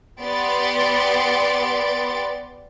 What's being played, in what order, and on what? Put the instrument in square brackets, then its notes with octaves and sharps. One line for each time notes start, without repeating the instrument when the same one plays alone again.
[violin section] B3 G4 D5 C6 A6 D7